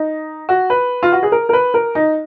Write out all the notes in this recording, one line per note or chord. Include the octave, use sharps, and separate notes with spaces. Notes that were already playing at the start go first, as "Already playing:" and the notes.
Already playing: D#4
F#4
B4
F4
F#4
G#4
A#4
A#4
B4
A#4
D#4